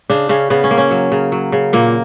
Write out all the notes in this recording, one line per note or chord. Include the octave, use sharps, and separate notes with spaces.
C#3 D4
C#3 C#4
C#3 B3
C#4
A#3
C#4
F#3
C#3
F#3
C#3
A#2 A#3